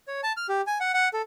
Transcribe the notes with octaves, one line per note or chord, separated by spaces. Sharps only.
C#5
A5
F6
G4
G#5
F#5
F#5
A4